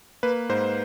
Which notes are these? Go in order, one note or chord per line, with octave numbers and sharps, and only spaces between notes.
A#3 B4
G#2 C5